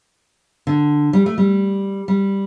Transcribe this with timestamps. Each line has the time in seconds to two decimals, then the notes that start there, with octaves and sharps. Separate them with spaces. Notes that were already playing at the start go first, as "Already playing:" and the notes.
0.67 D3
1.13 G3
1.26 A3
1.38 G3
2.08 G3